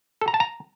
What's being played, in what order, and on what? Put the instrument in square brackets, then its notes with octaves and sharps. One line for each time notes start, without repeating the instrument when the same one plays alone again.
[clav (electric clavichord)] A4
A#5
A5
A#5